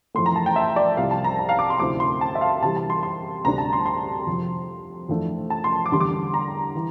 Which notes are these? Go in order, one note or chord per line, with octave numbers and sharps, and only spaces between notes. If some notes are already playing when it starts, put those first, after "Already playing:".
F2 E3 A3 C6
A#5
A5
G5
E5
D5
C2 C3 F3 F5
A5
A#5
A5
F5
D6
C6
D2 C3 F3 C4 E4 D6
C6
A5
E5
F5
C3 E3 G3 A5
A5
C6
C6
D2 C3 G3 D4 A#5
A5
C6
C6
F2 C3 F3
F2 E3 A3 D4
A5
C6
D6
E2 D3 G3 D4 C6
D6
A#5
E3